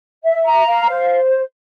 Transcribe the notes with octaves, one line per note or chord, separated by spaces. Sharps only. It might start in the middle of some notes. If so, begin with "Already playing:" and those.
E5
A#5
F5
C5